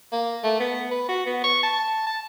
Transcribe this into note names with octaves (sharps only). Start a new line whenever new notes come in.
A#3
A3
B3
B4
F#4
B3
C#6
A5
A5